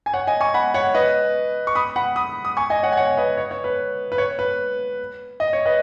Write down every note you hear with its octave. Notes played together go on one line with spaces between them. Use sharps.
G#5
C#5 F#5
D#5 G#5
G#5 C#6
F#5 B5
C#5 F#5
B4 D#5
C#6
B5 D#6
F#5 B5
B5 D#6
D#6
G#5 C#6
D#5 G#5
C#5 F#5
G#5
C#5 F#5
B4 D#5
C#5
C#5
B4
B4
C#5
B4
D#5
C#5
B4 D#5